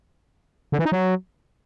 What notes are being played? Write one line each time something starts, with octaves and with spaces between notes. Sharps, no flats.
D3
E3
D#4
F#3